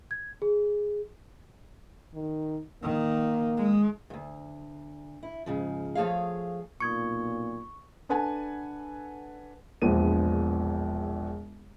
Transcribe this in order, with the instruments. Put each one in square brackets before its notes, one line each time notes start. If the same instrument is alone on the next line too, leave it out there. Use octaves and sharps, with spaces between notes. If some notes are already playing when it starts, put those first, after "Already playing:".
[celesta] G#6
G#4
[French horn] D#3
[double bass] D#3 [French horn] A#3
[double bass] G#3
[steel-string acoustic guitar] D2 G2
E4
G#2 C#3 F3
F3 A3 G#4 C#5 F5
[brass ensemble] B1 A#2 [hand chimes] C#6 [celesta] D#6 G#6 C#7
[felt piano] D4 A4 B4 F#5 G#5 A5
[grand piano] E1 A#1 E2 F3 B3 D#7